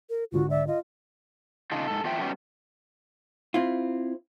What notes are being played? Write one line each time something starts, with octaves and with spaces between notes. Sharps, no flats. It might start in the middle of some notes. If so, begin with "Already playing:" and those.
A#4
C2 G#2 D3 F4 F#4
D5 E5
F4 D#5
C#3 D4 D#4 F4
G#2 A4
E2 D4 F4 C5 E5 G5
G3 B3 C#4 F#4 G4
C4 E4 F4